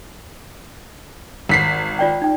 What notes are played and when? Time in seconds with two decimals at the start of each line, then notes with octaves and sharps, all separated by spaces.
1.49 G#1 B6 C7
1.99 F4 D5 G5
2.22 D#4 G5